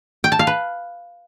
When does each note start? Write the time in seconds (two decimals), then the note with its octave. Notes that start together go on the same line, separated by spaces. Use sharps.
0.24 G5
0.32 A5
0.39 F5
0.47 B4